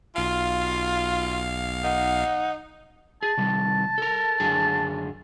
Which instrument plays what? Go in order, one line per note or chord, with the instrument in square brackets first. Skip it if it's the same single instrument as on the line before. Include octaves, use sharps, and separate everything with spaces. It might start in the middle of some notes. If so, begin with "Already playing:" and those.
[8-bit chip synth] B1 F5 [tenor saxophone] F4
[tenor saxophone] D#4 [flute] F#5
[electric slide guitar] G#4 [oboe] A5
[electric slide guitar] C3 D#3 G3
A4 A#4
F#2 D3 G#4